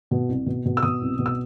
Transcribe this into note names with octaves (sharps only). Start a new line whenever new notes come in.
B2
C2
B2
B2
E6
B2 D#6
C2
B2
E6